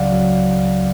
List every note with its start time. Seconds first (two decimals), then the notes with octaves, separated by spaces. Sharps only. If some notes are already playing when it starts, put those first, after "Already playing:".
Already playing: C#2 C#3 F#3 D5 F5 F#5
0.12 F#3